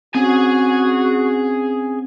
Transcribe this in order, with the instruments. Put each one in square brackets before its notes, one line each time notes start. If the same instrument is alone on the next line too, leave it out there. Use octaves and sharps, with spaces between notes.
[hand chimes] C4 C#4 [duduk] F#4 [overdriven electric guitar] G#4 G#5